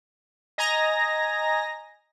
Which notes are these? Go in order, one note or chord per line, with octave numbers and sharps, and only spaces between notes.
D#5 G#5 A#5 A#6